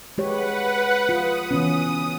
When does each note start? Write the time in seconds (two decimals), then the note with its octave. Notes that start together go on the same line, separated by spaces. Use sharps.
0.18 G#3 G4 B4 C#5 F#5
1.09 F4 D#6
1.51 E3 B3 C#4